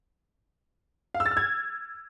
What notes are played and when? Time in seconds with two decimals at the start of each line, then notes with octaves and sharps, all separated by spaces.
1.15 F5
1.20 E6
1.26 A6
1.31 F6
1.37 G#6